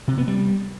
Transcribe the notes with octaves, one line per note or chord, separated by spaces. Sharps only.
C3
B3
G3